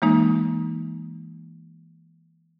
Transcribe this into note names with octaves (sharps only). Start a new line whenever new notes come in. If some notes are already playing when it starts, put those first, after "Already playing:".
E3 G#3 A#3 D#4